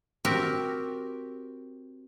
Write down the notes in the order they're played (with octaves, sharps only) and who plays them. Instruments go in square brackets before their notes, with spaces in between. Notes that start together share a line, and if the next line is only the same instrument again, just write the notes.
[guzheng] C4 F#4 G4 A#4